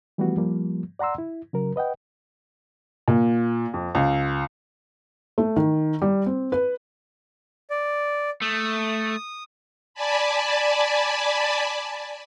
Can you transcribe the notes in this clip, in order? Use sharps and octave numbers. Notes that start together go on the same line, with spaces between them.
E3 F3 G3 A3 B3 F#4
F3 G3 A#3
D5 F#5 A#5 C6 E6
E4
C#3 F#3 A#4
B4 D#5 F#5 G5
A#2
F2
C#2
A3
D#3
G3
C4
B4
D5
A3 D#6
D5 G#5 A5 B5